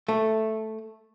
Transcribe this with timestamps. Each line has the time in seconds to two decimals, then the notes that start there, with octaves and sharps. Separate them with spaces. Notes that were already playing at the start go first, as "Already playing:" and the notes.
0.08 A3